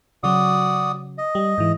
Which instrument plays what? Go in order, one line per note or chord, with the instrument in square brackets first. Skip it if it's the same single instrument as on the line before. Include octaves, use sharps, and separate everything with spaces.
[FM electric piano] C#3 F#3 [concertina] F#4 D5 D#6
[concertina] D#5
[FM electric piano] G3
G#2 E3